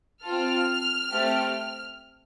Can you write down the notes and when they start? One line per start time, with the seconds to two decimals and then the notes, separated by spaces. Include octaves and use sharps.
0.23 C4 F4 A4 F6
1.11 A3 C4 G4